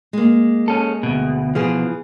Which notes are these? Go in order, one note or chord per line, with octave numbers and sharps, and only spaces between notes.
G#3 A#3
C#4 A4
D2 B2
B2 E3 F3 G#4